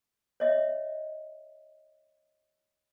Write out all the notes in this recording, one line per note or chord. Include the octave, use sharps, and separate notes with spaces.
C#5 D#5 E5